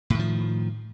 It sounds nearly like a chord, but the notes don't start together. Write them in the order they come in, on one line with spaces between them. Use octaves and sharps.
A2 D#3 F3